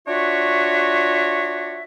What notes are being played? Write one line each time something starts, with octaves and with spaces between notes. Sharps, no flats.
D4 F4 F#4 C#5 E5